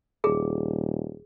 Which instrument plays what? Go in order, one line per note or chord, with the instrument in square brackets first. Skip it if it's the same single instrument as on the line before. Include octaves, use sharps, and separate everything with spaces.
[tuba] D#1 [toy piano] G#4